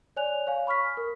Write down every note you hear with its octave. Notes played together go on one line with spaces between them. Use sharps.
C#5 D5 G#5 F#6 F7
C#5 F5 G#5
B5 C#6 F6 B6
A#4